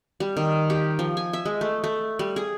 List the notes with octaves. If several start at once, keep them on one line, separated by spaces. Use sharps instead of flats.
G3
D#3
G4
F3
G#5
E5
G#3
A3
A3
G3
G#4